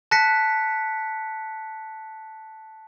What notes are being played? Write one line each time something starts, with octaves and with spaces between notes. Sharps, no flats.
A5 F#6 A#6 B6 C#7